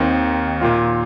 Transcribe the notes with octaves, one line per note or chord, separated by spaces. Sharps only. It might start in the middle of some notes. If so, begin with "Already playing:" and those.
Already playing: D#2 D#3 C4 D#4
A#2 A#3 F4